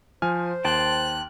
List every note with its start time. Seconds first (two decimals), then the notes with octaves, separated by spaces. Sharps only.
0.22 F3 C5 G#5 F6
0.65 D#2 G5 A5 C6 F#6